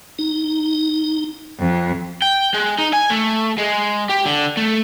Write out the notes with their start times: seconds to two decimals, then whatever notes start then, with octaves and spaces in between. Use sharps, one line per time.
0.19 D#4
1.58 F2
2.22 G5
2.54 G#3
2.79 D#4
2.93 G#5
3.10 A3
3.58 G#3
4.09 G4
4.26 D3
4.57 A3